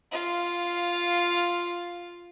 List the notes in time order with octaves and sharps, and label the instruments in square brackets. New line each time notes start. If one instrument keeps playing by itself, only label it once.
[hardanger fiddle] F4 F5